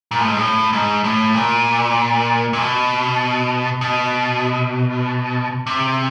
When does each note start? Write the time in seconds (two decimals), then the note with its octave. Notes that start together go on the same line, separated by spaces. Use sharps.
0.11 A#2
0.19 A2
0.28 G#2
0.36 A2
0.73 G#2
1.04 A2
1.34 A#2
2.53 A#2
2.58 B2
3.81 B2
5.67 C3